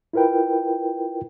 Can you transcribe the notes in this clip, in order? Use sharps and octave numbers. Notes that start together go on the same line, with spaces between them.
E4 F4 A#4 B4 G5